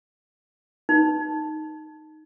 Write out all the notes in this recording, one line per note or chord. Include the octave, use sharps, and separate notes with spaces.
D#4